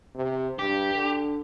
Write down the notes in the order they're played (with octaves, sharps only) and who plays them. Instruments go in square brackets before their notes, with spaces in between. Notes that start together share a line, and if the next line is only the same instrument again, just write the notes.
[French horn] C3
[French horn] G2 [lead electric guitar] G4
[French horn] D3